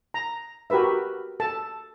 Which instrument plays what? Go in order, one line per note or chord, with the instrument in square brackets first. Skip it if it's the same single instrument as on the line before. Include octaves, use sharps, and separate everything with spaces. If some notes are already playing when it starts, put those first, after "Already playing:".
[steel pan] A#5
F#4 G4 A#4 B4 E5
A4 A5